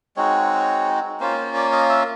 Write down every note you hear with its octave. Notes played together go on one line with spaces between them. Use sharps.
G#3 C4 D#4 F#4 C#5
A#3 C#4 F4 C5
C5
D5
D#5
E5